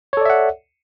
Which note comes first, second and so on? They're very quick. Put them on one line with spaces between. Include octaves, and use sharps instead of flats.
C#5 A4 D5 E5 F#5